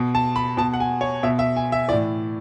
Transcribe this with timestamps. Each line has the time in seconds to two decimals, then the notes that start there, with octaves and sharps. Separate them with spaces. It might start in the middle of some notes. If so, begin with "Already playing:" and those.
Already playing: B2
0.15 A5
0.36 B5
0.57 B2 A5
0.73 F#5
0.80 G#5
1.01 C#5
1.23 B2 E5
1.39 E5
1.56 G#5
1.72 E5
1.88 E3 D5
1.93 A2